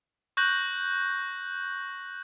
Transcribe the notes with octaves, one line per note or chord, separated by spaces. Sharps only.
C#6 F#6 G6 A#6 F#7